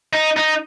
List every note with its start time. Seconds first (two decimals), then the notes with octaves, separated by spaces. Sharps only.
0.13 D#4
0.37 D#4